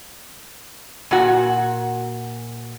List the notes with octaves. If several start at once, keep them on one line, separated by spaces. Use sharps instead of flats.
A#2 F#4